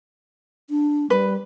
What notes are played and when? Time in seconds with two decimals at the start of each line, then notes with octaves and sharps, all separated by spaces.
0.70 D4
1.10 G3 B4